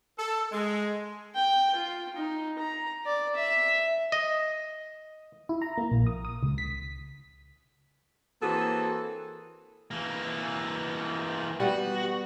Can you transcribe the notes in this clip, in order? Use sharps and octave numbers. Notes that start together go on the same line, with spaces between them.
A4
G#3
G5
F4
D#4
A#5
D5
E5
D#5
E4
A#5
A#3
A#1
D#6
D#6
C#2
B6
E3 A#3 C4 F#4 G#4 A4
E3 A#3
G3 B3 F#4